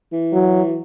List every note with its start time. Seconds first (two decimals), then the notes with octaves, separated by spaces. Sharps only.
0.12 E3
0.32 F#3